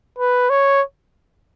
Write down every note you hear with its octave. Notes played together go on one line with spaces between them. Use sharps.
B4
C#5